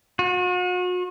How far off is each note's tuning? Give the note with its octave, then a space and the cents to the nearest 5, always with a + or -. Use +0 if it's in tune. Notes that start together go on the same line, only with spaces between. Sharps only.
F#4 -40